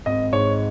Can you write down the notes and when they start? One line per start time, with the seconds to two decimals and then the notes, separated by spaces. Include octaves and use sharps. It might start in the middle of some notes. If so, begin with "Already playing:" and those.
0.06 G#1 D#5
0.33 G#2 C#5